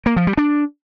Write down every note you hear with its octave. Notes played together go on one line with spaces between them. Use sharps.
A#3
F3
G3
D4